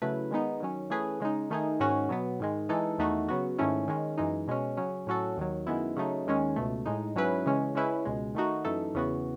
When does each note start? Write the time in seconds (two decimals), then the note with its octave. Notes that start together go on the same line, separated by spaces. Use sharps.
0.02 C#3 F#3 A3 E4 B4
0.31 D#3 G#3 B3 D#4
0.60 D#3 F#3 C#4
0.90 E3 A3 C#4 G#4 B4
1.20 C#3 G#3 D#4
1.50 D#3 A3 D#4 G#4
1.80 G#2 D#3 G#3 C#4 F#4
2.09 B2 F#3 B3
2.40 G#2 D#3 G#3
2.69 E3 G#3 D#4 A4
2.98 E2 D#3 A3 D#4 F#4
3.29 C#3 F#3 B3 F#4
3.58 G#2 D#3 A3 C#4 E4
3.88 D#3 G#3 C#4
4.18 F#2 E3 G#3 D#4
4.48 B2 G#3 C#4
4.77 C#3 F#3 C#4
5.07 A2 F#3 C#4 F#4 A4
5.37 D#2 D#3 F#3
5.67 F#2 D#3 G#3 B3 E4
5.96 C#3 F#3 A3 D#4
6.26 D#2 D#3 G#3 C#4
6.56 C#2 B2 A3
6.86 A2 G#3 D#4
7.15 G#2 F#3 C#4 E4 B4
7.46 C#3 E3 G#3 C#4
7.75 C#3 G#3 C#4 E4 B4
8.05 C#2 B2 G#3
8.35 D#3 A3 D#4 F#4
8.65 F#2 E3 A3 D#4 A4
8.94 E2 C#3 E3 B3 F#4